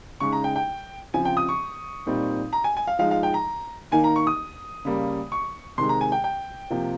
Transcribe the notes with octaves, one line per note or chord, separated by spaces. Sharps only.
C#3 G#3 D#4 C#6
A#5
G5
G5
C#3 F3 C4 G#5
G5
D#6
C#6
A#2 G3 C4 D#4
A#5
G#5
G#5
F5
F3 G#3 D#4 F5
F5
G5
A#5
D#3 A#3 D#4 G#5
A#5
C#6
D#6
C#3 G3 A#3
C#6
C3 D#3 G#3 C6
A#5
G#5
G5
G5
C3 F3 A#3